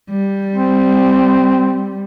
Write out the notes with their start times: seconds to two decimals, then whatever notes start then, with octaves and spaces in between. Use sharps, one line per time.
0.10 G3
0.55 C4